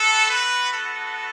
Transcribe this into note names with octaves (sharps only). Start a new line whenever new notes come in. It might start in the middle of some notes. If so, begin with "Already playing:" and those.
Already playing: B3 F#4 A4
B4
A4